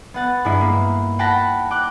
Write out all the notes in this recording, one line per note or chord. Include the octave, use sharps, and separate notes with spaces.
B3 F#5 A6
G2 G#3 D#4 E4
A#3
F#5 G5 A5 B5 A#6
G5 D6 F#6